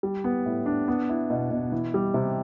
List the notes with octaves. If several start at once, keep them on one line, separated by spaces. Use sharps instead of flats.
G3
B3
A2
D4
B3
E4
B2
B2
E3
G3
C3